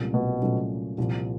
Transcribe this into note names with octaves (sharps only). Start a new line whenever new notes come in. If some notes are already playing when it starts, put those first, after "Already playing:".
Already playing: C2 A#2 F#3 A3 C#4
B2
C2 A#2 F#3 A3 C#4
C2 A#2 F3